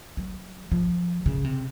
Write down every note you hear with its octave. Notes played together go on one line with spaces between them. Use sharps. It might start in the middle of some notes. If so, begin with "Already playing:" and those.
F#3
F3
C#3
C3